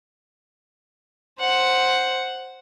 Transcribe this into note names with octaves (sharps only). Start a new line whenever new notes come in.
C5 F#5